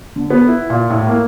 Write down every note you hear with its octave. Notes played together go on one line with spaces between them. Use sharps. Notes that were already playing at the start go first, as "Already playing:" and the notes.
D3
B3
E4
A#2
A2
A#3